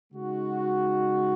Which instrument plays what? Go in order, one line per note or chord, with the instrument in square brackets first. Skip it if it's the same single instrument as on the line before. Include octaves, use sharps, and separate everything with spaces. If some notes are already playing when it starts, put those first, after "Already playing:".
[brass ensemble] C#3 G#3 D#4 F#4